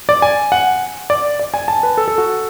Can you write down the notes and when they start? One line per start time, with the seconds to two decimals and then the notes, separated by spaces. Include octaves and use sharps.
0.09 D5
0.22 G#5
0.52 F#5
1.10 D5
1.39 D5
1.54 G#5
1.68 A5
1.83 B4
1.97 A4
2.08 A4
2.18 F#4